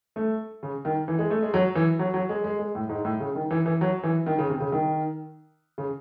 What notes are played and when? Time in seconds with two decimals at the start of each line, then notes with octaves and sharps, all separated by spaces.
0.16 A3
0.63 C#3
0.85 D#3
1.08 E3
1.19 G#3
1.30 A3
1.42 G#3
1.54 F#3
1.75 E3
1.99 F#3
2.14 F#3
2.29 G#3
2.44 G#3
2.59 G#3
2.75 A2
2.89 G#2
3.05 A2
3.20 C#3
3.35 D#3
3.51 E3
3.66 E3
3.81 F#3
4.03 E3
4.26 D#3
4.38 C#3
4.49 C3
4.60 C#3
4.72 D#3
5.78 C#3